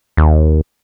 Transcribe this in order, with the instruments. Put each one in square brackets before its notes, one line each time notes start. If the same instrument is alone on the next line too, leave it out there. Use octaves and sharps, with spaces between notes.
[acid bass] D#2